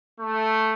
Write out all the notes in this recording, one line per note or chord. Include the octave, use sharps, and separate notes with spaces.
A3